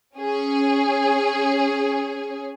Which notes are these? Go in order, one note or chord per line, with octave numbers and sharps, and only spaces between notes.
C#4 G#4